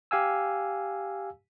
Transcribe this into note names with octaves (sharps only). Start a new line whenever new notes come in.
G4 F5 G#5 E6